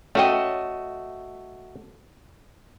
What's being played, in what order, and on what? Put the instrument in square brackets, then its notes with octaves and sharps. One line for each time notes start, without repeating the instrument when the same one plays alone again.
[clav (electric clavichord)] A3 F#4 D#5 [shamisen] C#4 G5